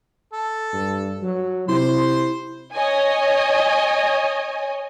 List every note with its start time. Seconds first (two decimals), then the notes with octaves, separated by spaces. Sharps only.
0.33 A4
0.73 G2
1.23 F#3
1.68 C3 E4 C5 C6
2.73 C#5 D#5 G#5